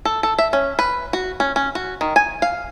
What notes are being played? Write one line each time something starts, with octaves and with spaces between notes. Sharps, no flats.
A4
A4
E5
C#4
B4
F#4
C#4
C#4
F#4
D#3
G#5
F5